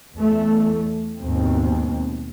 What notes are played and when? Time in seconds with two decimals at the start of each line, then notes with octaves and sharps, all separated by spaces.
0.16 E2 A3
1.20 D#2 G#2 B2 C4